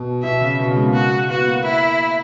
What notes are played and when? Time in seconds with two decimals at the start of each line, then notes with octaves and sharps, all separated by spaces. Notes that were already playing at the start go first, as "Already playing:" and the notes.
Already playing: B2
0.24 B2 E5
0.41 C#3
0.59 B2
0.68 C#3
0.77 G#3
0.85 A#3
0.94 F#4
1.29 B3 F#4
1.46 A#3
1.63 A#3 E4